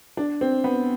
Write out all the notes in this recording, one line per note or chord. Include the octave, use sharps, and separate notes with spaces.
D4
C4
B3